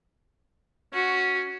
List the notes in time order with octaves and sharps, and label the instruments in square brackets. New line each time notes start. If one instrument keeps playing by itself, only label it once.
[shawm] C#4 [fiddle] F#4